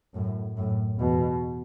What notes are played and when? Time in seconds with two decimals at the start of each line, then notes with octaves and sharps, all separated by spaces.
0.14 F#2 A2
0.57 F#2 A2
0.99 E2 B2